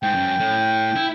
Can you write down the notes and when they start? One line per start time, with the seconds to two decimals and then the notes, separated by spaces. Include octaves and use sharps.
0.03 G#2 G5
0.15 F#2
0.40 A2
0.96 E4